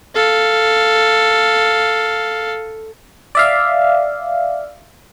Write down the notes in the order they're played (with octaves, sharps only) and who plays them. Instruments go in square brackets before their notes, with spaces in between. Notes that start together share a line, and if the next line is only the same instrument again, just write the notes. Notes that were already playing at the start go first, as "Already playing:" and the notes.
[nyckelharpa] A4 F5
[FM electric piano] D5 E5 F5